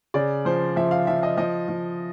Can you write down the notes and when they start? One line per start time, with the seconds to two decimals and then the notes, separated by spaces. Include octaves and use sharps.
0.14 C#3 D5
0.45 F3 C5
0.76 F3 E5
0.91 F5
1.07 F3 E5
1.23 D#5
1.37 F3 D#5
1.68 F3